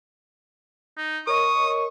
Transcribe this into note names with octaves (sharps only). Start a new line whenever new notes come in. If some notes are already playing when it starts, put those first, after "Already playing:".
D#4
A#4 C#5 D#5 C#6 D#6